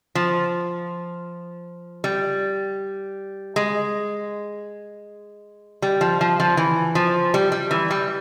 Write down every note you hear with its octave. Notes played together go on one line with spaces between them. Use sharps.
F3
G3
G#3
G3
F3
F3
F3
E3
F3
G3
G3
E3
G3